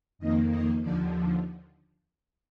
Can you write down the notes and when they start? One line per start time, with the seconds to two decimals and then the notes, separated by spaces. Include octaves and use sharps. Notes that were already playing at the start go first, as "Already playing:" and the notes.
0.19 F2 D#3 A#3 D#5
0.51 D#5
0.82 D#2 D3 F3 D5